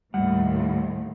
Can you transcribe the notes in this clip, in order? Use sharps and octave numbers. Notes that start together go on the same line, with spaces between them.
D#2 A2 G3 F#5